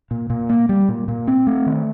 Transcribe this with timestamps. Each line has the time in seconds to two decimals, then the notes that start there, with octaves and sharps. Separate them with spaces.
0.11 A#2
0.30 A#2
0.49 A#3
0.69 G3
0.89 A#2
1.08 A#2
1.28 C4
1.47 A3
1.66 D#3